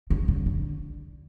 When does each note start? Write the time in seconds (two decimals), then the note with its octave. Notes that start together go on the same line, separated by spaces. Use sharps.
0.10 D3
0.28 C#3
0.46 D3